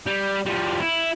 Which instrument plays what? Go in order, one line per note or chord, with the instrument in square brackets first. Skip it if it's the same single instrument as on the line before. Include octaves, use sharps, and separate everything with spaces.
[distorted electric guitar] G3
F3 G3
E4